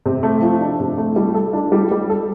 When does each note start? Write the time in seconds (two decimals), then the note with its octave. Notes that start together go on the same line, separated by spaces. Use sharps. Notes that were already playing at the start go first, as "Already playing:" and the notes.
0.06 C3
0.23 A3
0.42 F3
0.61 D4
0.80 C3
0.98 A3
1.16 G3
1.35 A4
1.53 D4
1.72 G3
1.92 G3
2.09 A4